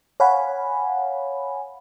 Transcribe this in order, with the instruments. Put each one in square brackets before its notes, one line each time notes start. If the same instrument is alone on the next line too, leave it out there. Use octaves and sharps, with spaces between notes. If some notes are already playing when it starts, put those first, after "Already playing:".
[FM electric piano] C#5 F5 F#5 G#5 B5